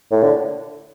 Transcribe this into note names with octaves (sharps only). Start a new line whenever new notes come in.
A2
D3